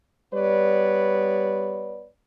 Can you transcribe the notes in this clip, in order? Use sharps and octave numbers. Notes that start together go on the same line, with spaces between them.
G3 B3 B4 C#5 D5